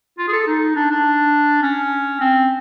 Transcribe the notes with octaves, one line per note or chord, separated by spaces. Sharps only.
F4
G#4
A4
D#4
D4
D4
C#4
C4